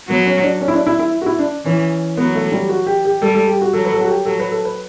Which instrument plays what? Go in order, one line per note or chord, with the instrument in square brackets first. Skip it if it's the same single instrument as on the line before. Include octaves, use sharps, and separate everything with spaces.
[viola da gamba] F#3 [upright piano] B3
[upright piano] C#4
D4
C#4
E4
D4
E4
E4
F#4
E4
D4
[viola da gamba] E3 [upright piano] C#4
[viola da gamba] F#3 [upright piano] B3
[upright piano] A3
G3
F#4
G4
G4
[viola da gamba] G3 [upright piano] A4
[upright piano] A4
G4
F#4
[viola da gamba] F#3 [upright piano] A4
[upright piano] B4
A4
F#4
G4
[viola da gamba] F#3 [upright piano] A4
[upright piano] B4
A4
B4